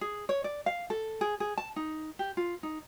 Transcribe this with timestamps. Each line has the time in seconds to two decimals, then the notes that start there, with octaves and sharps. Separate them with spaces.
0.01 G#4
0.29 C#5
0.44 D5
0.66 F5
0.90 A4
1.21 G#4
1.40 G#4
1.58 A5
1.76 D#4
2.19 G4
2.37 F4
2.63 D#4